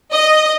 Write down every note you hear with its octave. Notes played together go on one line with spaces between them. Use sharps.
D#5